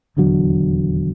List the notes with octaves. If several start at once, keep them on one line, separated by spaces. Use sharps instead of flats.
D#1 E2 D3 F#3